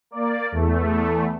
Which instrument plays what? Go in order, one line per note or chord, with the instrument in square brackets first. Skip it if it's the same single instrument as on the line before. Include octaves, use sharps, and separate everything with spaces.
[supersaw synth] A#3 D5
E2 A3